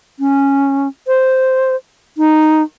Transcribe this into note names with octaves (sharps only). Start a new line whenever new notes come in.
C#4
C5
D#4